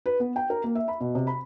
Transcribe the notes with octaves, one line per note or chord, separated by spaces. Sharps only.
B4
B3
G5
A#4
A#3
E5
B5
B2
C3
B5